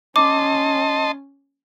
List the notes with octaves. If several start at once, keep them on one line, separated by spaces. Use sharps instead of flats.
C#4 D#5 A5 C6 D6